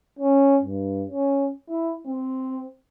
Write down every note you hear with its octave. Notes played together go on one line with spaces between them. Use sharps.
C#4
G2
C#4
E4
C4